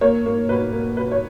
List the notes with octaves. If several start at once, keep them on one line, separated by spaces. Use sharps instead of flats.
A#3 C#5
A#3
B2 B4
A#3
B2 B4
C#5